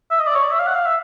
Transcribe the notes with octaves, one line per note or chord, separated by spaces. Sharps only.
E5
D#5
D5
C#5
D5
E5
F5
F#5
F5
E5